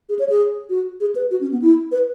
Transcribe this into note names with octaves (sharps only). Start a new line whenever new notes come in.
G#4
C#5
G#4
F#4
G#4
B4
F#4
C#4
B3
E4
B4